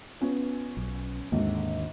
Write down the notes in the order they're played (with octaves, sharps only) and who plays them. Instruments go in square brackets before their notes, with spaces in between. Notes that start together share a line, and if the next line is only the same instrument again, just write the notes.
[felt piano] B3 C#4 F4
[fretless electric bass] B1
[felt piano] G#1 [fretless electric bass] D#2 D3